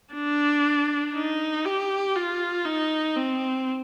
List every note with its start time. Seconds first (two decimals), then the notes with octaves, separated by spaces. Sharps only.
0.14 D4
1.15 D#4
1.65 G4
2.16 F4
2.65 D#4
3.17 C4